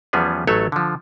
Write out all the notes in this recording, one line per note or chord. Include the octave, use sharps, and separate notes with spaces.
E2 F3 G3 B3 C#4 G#4
A1 F#3 A3 A4 C#5
D3 F3